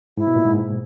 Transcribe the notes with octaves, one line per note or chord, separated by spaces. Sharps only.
G#2 E4
B2
A#2
G#2